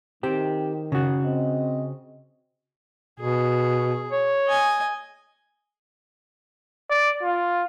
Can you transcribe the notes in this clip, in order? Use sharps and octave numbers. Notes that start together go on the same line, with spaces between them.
D#3 C4 G4
C#3 F#4
C4 D#5
B2 G#4
C#5
D#5 G#5
D5
F4